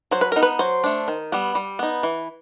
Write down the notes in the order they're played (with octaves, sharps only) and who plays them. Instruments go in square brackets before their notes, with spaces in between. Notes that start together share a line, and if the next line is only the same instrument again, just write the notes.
[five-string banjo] F#3 C5
B4
B3 D#4 A#4
B4
F#3 C5
A3 D4
D#3
G3 B3
G3
B3 D#4
E3